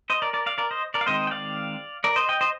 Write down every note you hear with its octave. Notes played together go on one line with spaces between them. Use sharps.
C5 D#5
A#4 D5
A#4 D5
D5 F5
A#4 D5
C5 D#5
A#4 D5
F5
D#3 G#3 C4 C5 D#5
G5
D5 F5
A#4 D5
C5 D#5
D#5 G5
C5 D#5